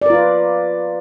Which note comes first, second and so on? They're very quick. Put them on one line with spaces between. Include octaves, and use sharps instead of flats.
D5 A#4 F4 B4